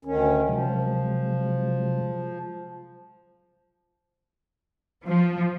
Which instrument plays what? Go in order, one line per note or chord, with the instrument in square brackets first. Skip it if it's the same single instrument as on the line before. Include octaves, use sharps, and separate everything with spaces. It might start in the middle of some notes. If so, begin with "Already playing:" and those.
[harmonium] D2 D#3 C#4
[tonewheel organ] C3 F#3 G#3 [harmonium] F3
[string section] F3